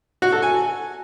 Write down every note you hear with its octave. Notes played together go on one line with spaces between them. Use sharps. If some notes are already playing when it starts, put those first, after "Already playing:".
F#4
A4
G#5